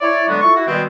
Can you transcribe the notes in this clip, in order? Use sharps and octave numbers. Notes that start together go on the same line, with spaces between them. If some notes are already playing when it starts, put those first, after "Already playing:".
E4 C#5 D5
D3 F#3 G#3 B3 D4 F#4
E4 F4 A4 C#6
E4 F#4 F#5
B2 D#3 G3 G#3 B3 C4